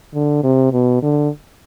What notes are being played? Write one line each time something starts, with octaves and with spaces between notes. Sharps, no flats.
D3
C3
B2
D3